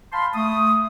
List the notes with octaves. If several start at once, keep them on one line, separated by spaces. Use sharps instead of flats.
F5 A5 B5 C6
A3 D#6